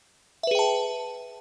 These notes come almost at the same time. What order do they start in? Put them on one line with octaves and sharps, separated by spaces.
E5 B4 G#4 G5 A5